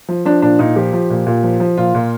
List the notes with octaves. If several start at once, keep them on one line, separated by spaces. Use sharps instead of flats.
F3
F3 D4
A#2 D4
A#2 D#4
F3 G4
F3
A#2
A#2
F3
F3
A#2 F4
A#2